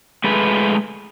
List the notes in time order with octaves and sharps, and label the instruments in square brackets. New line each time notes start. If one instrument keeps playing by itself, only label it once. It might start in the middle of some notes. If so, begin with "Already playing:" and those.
[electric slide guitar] G#3 A3 B4